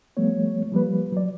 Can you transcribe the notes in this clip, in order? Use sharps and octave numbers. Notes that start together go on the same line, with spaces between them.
F3 G3 A3 B3 C#5
F3 G3 A#3 B4
F#3 D5